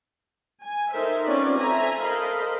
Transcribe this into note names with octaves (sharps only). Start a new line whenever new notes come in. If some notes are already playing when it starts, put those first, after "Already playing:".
G#5
D#4 A4 A#4 C5 E5
C4 C#4 F4 B4 D5
A4 C5 E5 G#5 A#5
A4 A#4 C5 D#5 F5 B5